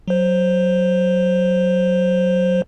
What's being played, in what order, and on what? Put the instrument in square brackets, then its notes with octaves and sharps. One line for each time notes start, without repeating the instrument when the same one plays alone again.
[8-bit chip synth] F#3 C5